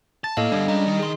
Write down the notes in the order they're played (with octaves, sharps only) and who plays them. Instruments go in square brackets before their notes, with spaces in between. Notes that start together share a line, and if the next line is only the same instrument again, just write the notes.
[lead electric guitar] A5 [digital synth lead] A6
[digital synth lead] A2 [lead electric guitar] A#3 [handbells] A4 D#5 F5
[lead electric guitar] G2 D3 [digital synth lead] G3 [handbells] D4
[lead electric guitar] G#3 C#4 [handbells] D#5 A#5
[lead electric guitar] D#3
[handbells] G#4 C6